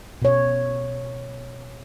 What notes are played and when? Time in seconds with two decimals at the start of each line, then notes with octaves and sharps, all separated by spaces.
0.22 B2 C#5